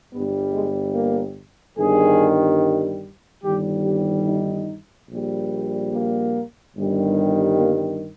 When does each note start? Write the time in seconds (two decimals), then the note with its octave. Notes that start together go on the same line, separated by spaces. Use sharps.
0.11 G1 G2 G3 B3
0.53 G#3
0.94 A#3
1.77 G1 G2 D#3 G3 G#4
3.43 G1 G2 D#3 G3 G4
3.84 G4
4.25 D#4
5.09 A#1 A#2 G3
5.92 A#3
6.75 G1 G2 D#3 G3
7.57 A#3